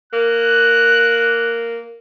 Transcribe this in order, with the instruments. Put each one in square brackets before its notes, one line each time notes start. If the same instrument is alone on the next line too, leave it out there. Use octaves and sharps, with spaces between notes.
[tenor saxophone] A#3 [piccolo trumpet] F#6